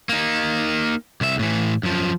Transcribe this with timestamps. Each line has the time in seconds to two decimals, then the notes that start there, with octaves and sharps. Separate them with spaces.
0.09 A#3 D#4
1.21 C2 E5
1.39 A2 E3
1.83 F#2 F3